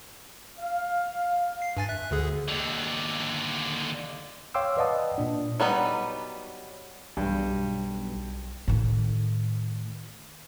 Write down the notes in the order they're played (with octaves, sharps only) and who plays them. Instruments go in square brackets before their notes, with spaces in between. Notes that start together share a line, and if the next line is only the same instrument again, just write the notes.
[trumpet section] F5
[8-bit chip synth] C7
G2 G#5 A6
E5 F#6
D2 D3 G#4
[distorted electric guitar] D#2 D3
[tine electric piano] C#5 F5 G5 C6 D6 E6
B4 D5 D#5 F#5 A5 D#6
A#2 D4
[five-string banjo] F#3 G3 B3 D#4
[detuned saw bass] B1 [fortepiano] G2
[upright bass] A2 D#3